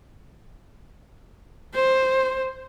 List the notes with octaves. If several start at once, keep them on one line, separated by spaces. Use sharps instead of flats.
C5